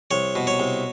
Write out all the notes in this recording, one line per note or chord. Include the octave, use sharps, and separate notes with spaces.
C2 C#5
B2
C#5
C2